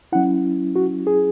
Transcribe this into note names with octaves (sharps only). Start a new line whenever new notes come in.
F#3 C#4 E4 F#5
F#4
G#4